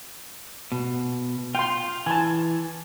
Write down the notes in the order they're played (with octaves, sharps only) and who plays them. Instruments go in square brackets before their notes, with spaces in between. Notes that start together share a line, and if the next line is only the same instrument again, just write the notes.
[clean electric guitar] B2
[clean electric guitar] F4 [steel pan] G5 C6
[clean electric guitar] E3 [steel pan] G#5 A5